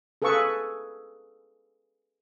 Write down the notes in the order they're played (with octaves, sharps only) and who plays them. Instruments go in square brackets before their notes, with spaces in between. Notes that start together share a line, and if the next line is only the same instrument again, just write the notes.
[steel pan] G#4 A4 B4 F5 C#6 E6